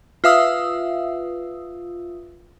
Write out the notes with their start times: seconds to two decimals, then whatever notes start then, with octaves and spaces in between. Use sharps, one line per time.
0.24 F4 B4 E5 F5 D#6 E6